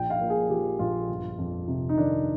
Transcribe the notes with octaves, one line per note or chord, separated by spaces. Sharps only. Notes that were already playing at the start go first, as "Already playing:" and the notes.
Already playing: A#1 G5
F5
A#2
G#4
F3 G4
A#1 F4
G1
F2
C3
D#4
D#3 D4